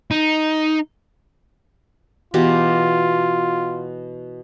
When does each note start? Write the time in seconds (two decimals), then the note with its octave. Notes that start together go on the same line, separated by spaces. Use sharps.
0.11 D#4
2.34 B2 E3 F4 G4